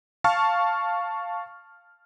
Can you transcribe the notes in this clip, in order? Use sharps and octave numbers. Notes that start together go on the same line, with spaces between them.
F5 A5 C#6 F6